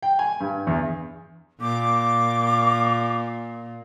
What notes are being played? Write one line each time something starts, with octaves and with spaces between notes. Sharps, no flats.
G5
G#5
G2
E2
A#2 D6